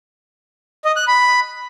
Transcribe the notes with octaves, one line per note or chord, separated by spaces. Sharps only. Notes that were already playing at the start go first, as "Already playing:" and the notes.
D#5
F#6
B5